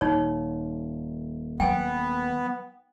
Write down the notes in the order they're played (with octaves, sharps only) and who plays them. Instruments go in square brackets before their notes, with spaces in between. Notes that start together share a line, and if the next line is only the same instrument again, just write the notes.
[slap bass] D#1 [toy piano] D#4 C#5
[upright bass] F#3 [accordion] B3 [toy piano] G5 G#5